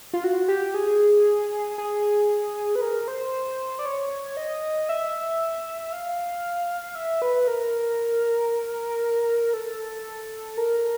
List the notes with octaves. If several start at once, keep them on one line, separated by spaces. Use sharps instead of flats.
F4
F#4
G4
G#4
G#4
B4
A#4
C5
D5
C#5
D#5
E5
F5
E5
B4
A#4
A4
A#4